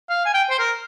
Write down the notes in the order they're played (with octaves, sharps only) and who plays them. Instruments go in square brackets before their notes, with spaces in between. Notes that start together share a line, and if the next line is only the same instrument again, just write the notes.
[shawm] F5
G#5
G5
C5
A#4